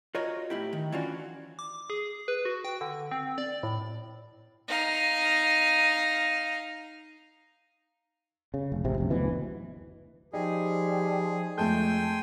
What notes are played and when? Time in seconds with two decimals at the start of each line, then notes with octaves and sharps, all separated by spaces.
0.15 F4 F#4 A#4 C#5 D#5
0.50 A2 E4 G4
0.73 D#3
0.92 E3 C#4 D4 F4 F#4
1.59 D6
1.90 G#4
2.28 B4
2.45 F#4
2.65 G5
2.81 D3
3.11 C4
3.38 D5
3.63 A2
4.69 D#4 F5
8.54 C#3
8.72 F1
8.85 A1 C3
8.98 F1 A#1
9.10 F#1 D2 B2 E3
10.33 F3 G3 D#4 G#4
11.58 F2 G#3 A3 A4 G5 G#5 C6 G6